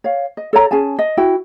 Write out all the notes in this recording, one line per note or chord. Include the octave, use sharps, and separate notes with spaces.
C#5 F5
D#5
A4 C#5 A#5
C#4 G#4 G#5 A5
D#5
E4 F#4 G5